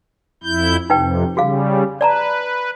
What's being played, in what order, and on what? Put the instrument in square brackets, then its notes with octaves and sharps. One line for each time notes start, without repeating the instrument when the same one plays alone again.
[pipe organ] F2 E4 G6
[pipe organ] F2 C3 [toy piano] D#4 B4 G5
[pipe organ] C#3 G3 [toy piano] F#4 G#4 F5
[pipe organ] B4 [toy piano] D5 A5 A#5